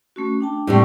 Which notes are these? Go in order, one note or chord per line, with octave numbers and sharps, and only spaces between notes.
A3 C#4 F#4
D4 G5 A5
A2 C3 G3 G5 A5 C#6